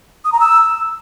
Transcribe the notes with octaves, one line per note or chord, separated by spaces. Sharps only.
D#6
A#5
E6